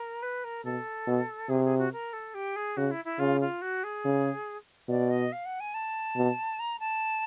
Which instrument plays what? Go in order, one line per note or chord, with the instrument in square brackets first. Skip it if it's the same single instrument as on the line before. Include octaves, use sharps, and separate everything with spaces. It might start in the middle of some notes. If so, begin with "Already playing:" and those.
Already playing: [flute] A#4
B4
A#4
[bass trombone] B2 [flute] A4
[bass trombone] B2
[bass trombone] C3 [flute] G#4
[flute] G#4
F#4
A#4
A4
G4
G#4
[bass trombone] C#3 [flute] F#4
[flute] E4
E4
[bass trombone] C#3 [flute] F4
[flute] F4
F#4
G#4
[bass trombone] C#3
[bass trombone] B2 [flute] D5
[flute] D#5
F5
F#5
G#5
A5
[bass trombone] B2
[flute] A#5
A5